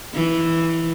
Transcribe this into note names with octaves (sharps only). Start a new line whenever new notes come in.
E3